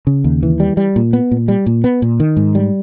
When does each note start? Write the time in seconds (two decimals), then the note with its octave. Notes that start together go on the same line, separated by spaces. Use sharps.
0.07 C#3
0.24 D#2
0.43 E3
0.60 G3
0.77 G3
0.96 A#2
1.13 B3
1.31 A#2
1.48 G3
1.66 A#2
1.84 B3
2.02 A#2
2.20 D#3
2.37 G#2
2.55 G3